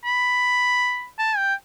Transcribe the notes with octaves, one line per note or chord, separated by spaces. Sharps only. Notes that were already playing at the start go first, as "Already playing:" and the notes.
B5
A5
G5